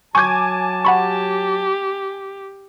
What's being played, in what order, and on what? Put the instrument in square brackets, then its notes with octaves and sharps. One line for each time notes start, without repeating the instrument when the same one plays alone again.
[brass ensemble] F#3 A5 [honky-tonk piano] G#5 D6 G#6 [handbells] C#6 G6
[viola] G4 [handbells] F#5 B5 C#6